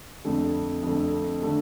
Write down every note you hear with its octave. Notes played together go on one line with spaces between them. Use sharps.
F2 D3 A3
F2 D3 A3
D3 A3